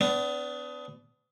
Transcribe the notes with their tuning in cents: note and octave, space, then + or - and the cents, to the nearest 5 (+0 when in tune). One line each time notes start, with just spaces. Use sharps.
B3 +30 D4 -25